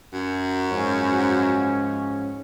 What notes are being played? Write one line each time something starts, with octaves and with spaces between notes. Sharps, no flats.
F#2
G#2 F3 C#4